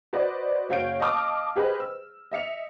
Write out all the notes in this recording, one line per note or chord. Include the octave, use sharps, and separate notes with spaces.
F#4 B4 C5 D5 D#5
F#1 F#4 C#5 F5 G6 D7
D#5 F5 A5 D6 D#6 F6
G4 G#4 B4 C5 D#5
E6
D#5 E5 C#7 F7